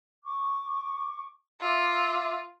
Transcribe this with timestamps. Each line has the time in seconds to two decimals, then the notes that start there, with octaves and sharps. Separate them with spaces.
0.24 C#6 D6
1.60 F4 E5 D6 E6